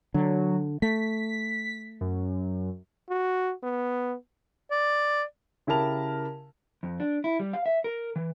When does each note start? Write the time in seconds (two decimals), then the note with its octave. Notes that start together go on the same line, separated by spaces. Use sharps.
0.14 D3 F#3
0.82 A3 B6
2.01 F#2
3.09 F#4
3.63 B3
4.71 D5
5.67 C#3 E4 G4 A#4 A5 F7
6.83 F2
7.00 D4
7.24 E4
7.40 G3
7.53 F5
7.66 E5
7.84 A#4
8.16 E3